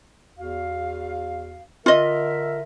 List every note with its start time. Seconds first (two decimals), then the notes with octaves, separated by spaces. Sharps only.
0.37 E2 F#4 F5
1.86 D3 F4 A#4 D#5 E5